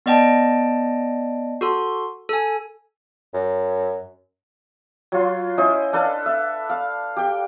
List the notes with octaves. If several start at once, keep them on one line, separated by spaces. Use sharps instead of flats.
B3 D5 D#5 G5 A5
F#4 A4 C6
A4 G#5
F#2
F#3 F4 C6
C#4 E4 C5 D#5
D4 A4 B4 F5
E5
F5
G4 G5